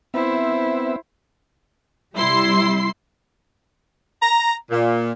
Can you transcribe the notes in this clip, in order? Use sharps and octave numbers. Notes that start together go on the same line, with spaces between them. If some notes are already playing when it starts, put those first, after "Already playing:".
B3 C4 E4 C5 E5
C3 G3 E4 C6 C7
A#5
A#2